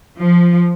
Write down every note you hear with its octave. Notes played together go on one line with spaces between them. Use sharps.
F3